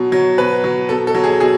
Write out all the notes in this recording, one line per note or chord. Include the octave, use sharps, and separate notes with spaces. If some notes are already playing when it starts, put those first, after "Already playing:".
Already playing: B2 F#3
F#3
B2 B4
F#3
B2 A4
A4
F#3
G#4
B2 G#4